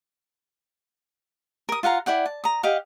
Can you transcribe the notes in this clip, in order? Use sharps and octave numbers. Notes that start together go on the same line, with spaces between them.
A#4 D#6
F4 F5 F#5 A#5
E4 D5 F#5 G5
A5
A#5 D#6
G4 D#5 F5 F#5